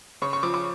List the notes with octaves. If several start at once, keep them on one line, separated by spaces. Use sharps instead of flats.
C#3 C#6
C#6
F3 D6
D6